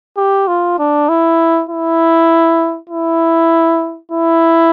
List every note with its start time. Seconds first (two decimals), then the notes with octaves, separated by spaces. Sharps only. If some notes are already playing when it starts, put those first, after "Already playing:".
0.17 G4
0.48 F4
0.79 D4
1.09 E4
1.69 E4
2.90 E4
4.12 E4